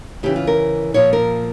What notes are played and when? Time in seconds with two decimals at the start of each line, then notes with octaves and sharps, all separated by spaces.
0.23 C#3 E3 G4
0.36 F4
0.47 A#4
0.94 A#2 F3 C#5
1.13 A#4